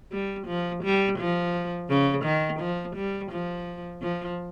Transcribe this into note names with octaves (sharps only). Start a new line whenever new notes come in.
G3
F3
G3
F3
C#3
D#3
F3
G3
F3
F3